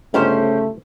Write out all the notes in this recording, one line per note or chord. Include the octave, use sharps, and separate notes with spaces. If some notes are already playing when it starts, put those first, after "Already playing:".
G1 G#2 C#3 A3 C#4 G4 C5